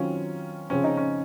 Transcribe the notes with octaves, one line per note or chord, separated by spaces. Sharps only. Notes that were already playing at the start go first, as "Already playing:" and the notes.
Already playing: D#3 F#3 C4 C#4 F4
C#3 F3 C4 C#4
D#4
C#4